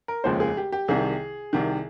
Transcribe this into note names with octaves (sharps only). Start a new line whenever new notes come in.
A#4
F1 D#2 C#3 F3 G#3 C5
G#4
G4
G4
C2 C3 D#3 G#4
C2 C3 D#3